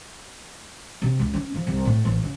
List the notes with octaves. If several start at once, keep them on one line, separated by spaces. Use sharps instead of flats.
C3
C#2
C#4
F3
C2
A2
A1
C#3